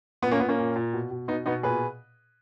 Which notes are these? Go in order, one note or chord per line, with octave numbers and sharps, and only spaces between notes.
A#2 B3
A#3 C#4
A#2 B3
A#3 C#4
A#2
A#2
B2
B2
B2 B3 D#4
B2 B3 D#4
A#2 G#4 B4